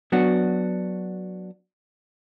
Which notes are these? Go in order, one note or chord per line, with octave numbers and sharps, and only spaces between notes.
F#3 B3 D4 F#4